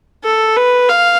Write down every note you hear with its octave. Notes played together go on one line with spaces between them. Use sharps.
A4
B4
F5